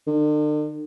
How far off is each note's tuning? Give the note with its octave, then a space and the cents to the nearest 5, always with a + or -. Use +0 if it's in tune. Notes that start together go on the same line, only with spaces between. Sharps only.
D3 +45